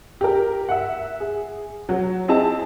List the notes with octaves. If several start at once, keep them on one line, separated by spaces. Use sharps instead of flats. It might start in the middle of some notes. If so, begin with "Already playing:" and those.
G4 A#4
E5 F#5
G#4
F#3
C4 E4 G#4 D#5 G#5 A5